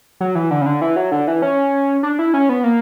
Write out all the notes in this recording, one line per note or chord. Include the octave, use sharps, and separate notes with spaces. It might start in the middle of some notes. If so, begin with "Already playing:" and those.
F#3
E3
D3
C#3
D3
E3
F#3
D3
E3
C#4
D4
E4
C#4
B3
A#3